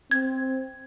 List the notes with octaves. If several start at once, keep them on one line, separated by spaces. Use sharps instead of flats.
C4 G#6